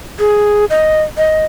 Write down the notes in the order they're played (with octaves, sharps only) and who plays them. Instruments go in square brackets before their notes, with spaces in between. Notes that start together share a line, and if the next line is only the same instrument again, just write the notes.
[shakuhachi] G#4
D#5
D#5